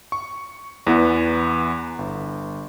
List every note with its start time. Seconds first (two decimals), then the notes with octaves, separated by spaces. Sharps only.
0.12 C#6
0.87 E2 E3 B3
1.99 G1